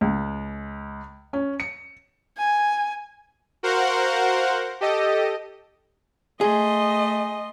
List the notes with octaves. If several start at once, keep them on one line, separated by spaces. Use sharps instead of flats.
C#2
C#4
C#7
G#5
F#4 A#4 C5 F5 F#5
G4 A4 D#5
A3 G#4 D#5 C6